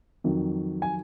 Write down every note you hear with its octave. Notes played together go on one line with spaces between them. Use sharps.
F2 D#3 F#3
G#5